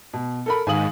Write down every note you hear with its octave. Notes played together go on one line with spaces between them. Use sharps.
B2
A4 A#4 B5
G#2 D#3 F5 G#5 D#6 F#7